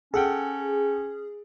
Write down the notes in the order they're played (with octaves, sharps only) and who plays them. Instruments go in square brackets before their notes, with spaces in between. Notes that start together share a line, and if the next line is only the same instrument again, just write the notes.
[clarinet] C#4 [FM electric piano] G#4 [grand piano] A4 F#5 G5